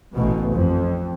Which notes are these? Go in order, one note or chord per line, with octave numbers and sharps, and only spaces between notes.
A1 B2
F2